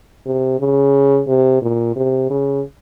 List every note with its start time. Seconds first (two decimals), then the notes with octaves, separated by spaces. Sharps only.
0.26 C3
0.60 C#3
1.27 C3
1.62 A#2
1.96 C3
2.30 C#3